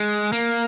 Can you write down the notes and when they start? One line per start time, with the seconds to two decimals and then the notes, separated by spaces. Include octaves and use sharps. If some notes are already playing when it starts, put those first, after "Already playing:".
Already playing: G#3
0.32 A#3